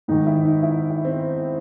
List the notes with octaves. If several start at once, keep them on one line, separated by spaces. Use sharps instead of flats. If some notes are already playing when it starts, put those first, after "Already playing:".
G#2 D#3 D#4
E4
D#4
E4
E4
C4